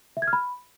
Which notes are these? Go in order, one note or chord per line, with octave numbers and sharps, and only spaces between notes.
E5
G#6
F6
B5